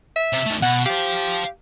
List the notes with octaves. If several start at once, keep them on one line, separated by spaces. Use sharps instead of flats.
E5
C3
D#3 A3
B2 F#5
G4 C5 F5